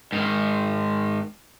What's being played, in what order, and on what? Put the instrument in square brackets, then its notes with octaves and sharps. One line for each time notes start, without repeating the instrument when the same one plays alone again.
[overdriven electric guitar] G#2 D#3